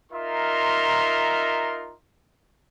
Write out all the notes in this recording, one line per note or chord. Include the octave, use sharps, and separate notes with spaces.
D#4 F4 A#4 E5 C6